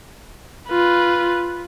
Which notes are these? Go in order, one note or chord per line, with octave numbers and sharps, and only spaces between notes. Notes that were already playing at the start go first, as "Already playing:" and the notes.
F4 B4